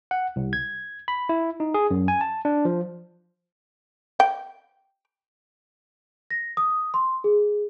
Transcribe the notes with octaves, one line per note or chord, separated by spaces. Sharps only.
F#5
C2
G#6
B5
E4
D#4
G#4
F#2
G#5
A5
D4
F3
G5
A#6
D#6
C6
G#4